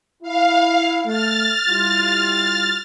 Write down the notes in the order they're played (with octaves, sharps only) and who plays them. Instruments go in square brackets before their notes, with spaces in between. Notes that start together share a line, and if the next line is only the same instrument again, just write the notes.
[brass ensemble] E4 [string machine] F5
[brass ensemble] A3 [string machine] F6 A6
[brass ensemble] G3 E4 F4